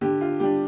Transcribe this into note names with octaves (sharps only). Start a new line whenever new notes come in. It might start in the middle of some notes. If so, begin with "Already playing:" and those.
D3 G4
F4
G3 D4 G4